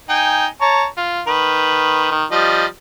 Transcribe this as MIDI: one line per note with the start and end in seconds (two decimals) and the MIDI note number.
0.09 0.46 63
0.09 0.46 79
0.09 0.46 80
0.61 0.85 73
0.61 0.85 81
0.61 0.85 82
0.97 1.21 65
1.27 2.11 51
1.27 2.11 71
2.11 2.24 51
2.32 2.65 53
2.32 2.65 55
2.32 2.65 75